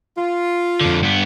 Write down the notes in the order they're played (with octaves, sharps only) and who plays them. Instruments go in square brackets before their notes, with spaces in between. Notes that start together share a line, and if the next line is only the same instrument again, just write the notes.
[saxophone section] F4
[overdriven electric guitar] F2 D3
G2 B3